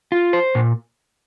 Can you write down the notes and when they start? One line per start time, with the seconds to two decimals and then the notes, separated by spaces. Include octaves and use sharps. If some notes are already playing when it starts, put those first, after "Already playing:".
0.12 F4
0.33 C5
0.55 A#2